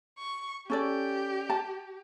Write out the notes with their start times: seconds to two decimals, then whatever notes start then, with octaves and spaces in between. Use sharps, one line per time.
0.18 C#6
0.70 C#4 G4 A4 D5
1.50 A5